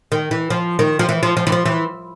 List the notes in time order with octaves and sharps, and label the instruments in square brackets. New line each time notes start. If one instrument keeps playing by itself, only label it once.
[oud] D#3
E3
F3
D#3
F3
E3
F3
F3
E3
F3
E3